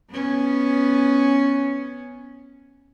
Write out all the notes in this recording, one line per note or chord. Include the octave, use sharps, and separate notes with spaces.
B3 C#4